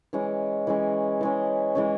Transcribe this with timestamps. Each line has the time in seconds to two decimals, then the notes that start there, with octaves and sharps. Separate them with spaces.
0.13 E3 G#3 C#4
0.67 E3 G#3 C#4
1.21 E3 G#3 C#4
1.75 E3 G#3 C#4